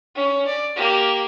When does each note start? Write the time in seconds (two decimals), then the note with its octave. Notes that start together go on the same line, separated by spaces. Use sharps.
0.15 C#4
0.47 D5
0.76 A#3 G4